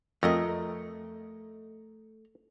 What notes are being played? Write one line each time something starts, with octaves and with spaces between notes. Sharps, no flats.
F2 A3 A#4 D#5